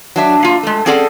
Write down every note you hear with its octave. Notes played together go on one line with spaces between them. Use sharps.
F#3 D4 E5
A#3 F4
G#3 A3
C4 C#4 G#4 A4 D5 F#5